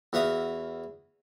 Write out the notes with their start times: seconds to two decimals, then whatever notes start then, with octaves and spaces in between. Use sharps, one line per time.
0.13 E2 F#4 E5 F5 D#6